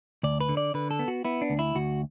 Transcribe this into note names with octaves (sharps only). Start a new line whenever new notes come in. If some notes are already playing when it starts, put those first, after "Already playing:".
D2 D5
B4
D3
D5
D3 B4
A4
B3
F#4
B3 E4
D4
D2
E4
D2 F#4